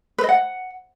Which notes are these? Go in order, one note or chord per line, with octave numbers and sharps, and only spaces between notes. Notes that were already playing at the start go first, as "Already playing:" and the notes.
B4
D#5
F#5